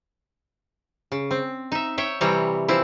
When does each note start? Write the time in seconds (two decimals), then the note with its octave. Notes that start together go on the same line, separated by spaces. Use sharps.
1.12 C#3
1.31 C4
1.72 D#4 E5
1.98 C#5 E5 G5
2.21 C3 E3 G3 C4 C#5 A#5
2.68 E3 F3 C4 E4